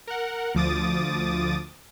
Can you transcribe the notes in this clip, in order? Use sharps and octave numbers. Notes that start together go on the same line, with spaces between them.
A#4 F#5
D2 F3 D6 D#6 A6